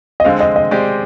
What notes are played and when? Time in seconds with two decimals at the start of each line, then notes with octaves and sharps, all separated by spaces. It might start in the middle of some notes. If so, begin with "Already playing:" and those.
0.20 D#5
0.24 D3 G#3 C4 F5
0.40 D#5
0.56 D#5
0.71 G#3 C4 G4 D5